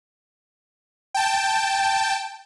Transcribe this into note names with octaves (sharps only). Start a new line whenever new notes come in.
G5 A5